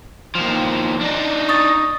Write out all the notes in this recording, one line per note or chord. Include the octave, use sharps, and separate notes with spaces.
D#2 F3
D4 D#4
C#6 D#6 A6